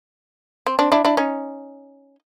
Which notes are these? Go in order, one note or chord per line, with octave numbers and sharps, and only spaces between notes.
C4
C4 D4
D4 E4
D4 E4
C#4 D#4